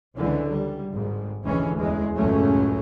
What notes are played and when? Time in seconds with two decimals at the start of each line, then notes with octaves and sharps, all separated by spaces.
0.15 C#2 D3 E3
0.49 G3
0.91 G#1 G#2
1.42 F1 D2 E3 G#3 C#4
1.77 E2 G#3
2.16 C#2 F#2 A2 F#3 A3 C#4